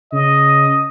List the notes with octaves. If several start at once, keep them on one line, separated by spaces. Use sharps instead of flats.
C#3 D#5